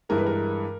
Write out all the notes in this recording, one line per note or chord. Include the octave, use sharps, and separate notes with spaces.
G2 E3 G#3 A#4
B4
A#4